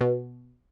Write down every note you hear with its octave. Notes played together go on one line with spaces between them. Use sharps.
B2